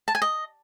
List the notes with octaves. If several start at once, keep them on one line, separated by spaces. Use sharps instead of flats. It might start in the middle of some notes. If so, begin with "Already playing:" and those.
A5
G#5
D#5